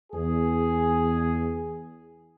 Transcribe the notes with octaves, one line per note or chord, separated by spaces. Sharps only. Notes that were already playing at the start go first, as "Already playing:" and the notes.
E2 G#4